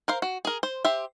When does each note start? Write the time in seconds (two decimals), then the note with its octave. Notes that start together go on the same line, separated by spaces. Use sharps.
0.08 A#4 C5 F5
0.22 F#4
0.45 G#4 A#4
0.63 C5
0.85 G4 C5 E5